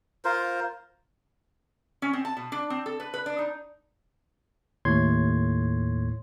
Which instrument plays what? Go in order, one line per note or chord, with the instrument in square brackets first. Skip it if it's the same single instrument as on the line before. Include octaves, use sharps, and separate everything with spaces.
[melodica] F4 A#4 C5
[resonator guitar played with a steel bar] C#4
C4
A5
B2
D4
C4
A4
B4
B4
D4
D#4
[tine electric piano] D#2 A2 C#5 C6 G#6